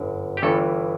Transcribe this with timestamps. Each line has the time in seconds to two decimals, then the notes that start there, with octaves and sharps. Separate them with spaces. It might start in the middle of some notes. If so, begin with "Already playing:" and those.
Already playing: G1 F#2
0.37 G4
0.42 G1 G2 E3 A4